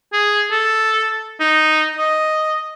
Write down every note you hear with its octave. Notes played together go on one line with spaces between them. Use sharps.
G#4
A4
D#4
D#5